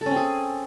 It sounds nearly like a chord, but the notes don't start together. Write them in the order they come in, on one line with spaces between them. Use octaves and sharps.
A4 C#4 C4 G#4